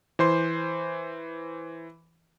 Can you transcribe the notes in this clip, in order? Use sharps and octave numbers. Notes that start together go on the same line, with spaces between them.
E3 C5 C6